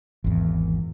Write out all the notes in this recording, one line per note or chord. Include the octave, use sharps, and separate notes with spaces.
G#1 E2